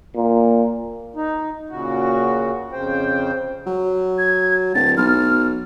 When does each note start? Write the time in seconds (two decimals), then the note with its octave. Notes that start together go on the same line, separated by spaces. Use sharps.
0.16 A#2
1.15 D#4
1.69 A#2 C#3 F#4
2.72 F2 C#3 C5 G5
3.66 F#3
4.18 G#6
4.75 D1 A6
4.97 B1 F6